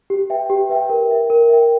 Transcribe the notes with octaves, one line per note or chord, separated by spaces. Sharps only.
G4
B4 E5 G5
G4
B4 E5 G5
A#4
E5 G5
A#4
E5 G5